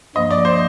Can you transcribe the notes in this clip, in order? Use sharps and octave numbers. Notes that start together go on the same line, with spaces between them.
G2 F3 A#3 D#5
D5
C5